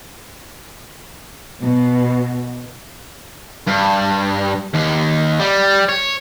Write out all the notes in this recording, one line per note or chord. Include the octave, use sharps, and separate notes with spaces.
B2
G2
D#2
G3
C#5